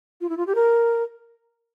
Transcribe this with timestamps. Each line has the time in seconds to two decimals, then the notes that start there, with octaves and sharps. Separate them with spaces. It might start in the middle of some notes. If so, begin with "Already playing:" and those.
0.21 F4
0.29 E4
0.37 F4
0.47 G4
0.55 A#4